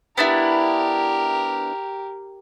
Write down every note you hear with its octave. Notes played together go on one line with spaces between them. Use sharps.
B3 D4 E4 G4 A#4